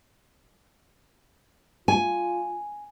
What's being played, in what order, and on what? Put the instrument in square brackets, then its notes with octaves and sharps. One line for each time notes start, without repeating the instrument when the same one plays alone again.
[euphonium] F4 [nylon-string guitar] G#5